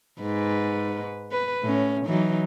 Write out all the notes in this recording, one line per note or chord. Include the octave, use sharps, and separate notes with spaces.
G#2 B4
B4
A2 C#4
E3 F#3 D#4